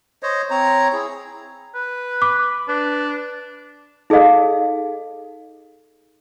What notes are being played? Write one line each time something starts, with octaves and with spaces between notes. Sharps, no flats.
C5 C#5 D#5
C4 C#5 A#5
E4 G#4
B4
B5 D6
D4 B4
D#4 G#4 A4 D#5 F5